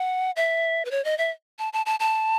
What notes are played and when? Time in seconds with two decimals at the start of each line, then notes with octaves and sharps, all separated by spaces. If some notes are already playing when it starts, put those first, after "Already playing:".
Already playing: F#5
0.36 E5
0.85 B4
0.91 C#5
1.05 D#5
1.18 E5
1.59 A5
1.73 A5
1.86 A5
2.00 A5